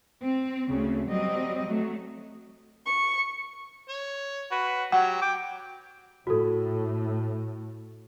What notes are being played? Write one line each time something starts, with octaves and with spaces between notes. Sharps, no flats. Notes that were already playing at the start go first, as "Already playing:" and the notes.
C4
D2 C#3 A3
F#3 G3 C4 D#5
F#3 A3
C#6
C#5
F#4 B4
F#3 G4 F#5
G5 D6
A2 F#4 A4